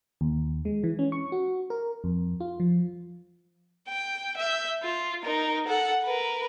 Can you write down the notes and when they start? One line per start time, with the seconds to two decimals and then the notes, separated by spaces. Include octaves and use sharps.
0.21 D#2
0.65 G#3
0.84 E3
0.99 C#4
1.12 C#6
1.32 F#4
1.70 A#4
2.04 F2
2.40 F4
2.60 F3
3.88 G5
4.37 E5 G6
4.83 F4
5.24 D#4 A#4
5.67 A4 F#5
6.05 A#4 B4